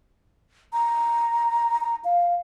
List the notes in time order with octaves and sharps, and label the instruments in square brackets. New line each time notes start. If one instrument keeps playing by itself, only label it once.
[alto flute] A#5
A#5
F5